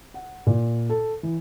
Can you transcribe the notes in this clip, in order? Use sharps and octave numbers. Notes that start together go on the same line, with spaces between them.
F#5
A#2
A4
E3